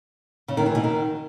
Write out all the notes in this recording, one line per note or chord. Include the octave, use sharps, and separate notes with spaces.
C#3
D#3
E3
B2
D#3